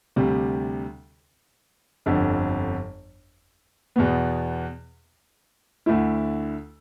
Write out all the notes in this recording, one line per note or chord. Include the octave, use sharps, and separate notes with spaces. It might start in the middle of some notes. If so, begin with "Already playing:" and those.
D2 C3 G3
G1 F2 D3
E2 B2 B3
D2 D3 A3 E4